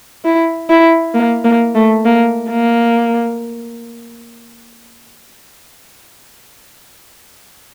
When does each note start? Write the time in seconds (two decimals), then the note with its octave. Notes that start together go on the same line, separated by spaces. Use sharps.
0.25 E4
0.70 E4
1.14 A#3
1.45 A#3
1.75 A3
2.05 A#3
2.50 A#3